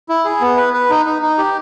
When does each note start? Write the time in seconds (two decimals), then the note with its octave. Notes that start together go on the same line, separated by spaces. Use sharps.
0.09 E4
0.25 G#4
0.41 B3
0.57 B4
0.73 B4
0.90 D#4
1.06 D#4
1.22 D#4
1.38 G4